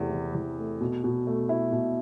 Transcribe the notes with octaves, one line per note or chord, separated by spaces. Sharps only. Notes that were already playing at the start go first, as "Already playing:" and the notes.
Already playing: E2 C3 A3
E3
E2
A3
B2
B2
A3
E4
B2